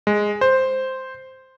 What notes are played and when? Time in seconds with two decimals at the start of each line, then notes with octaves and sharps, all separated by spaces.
0.07 G#3
0.41 C5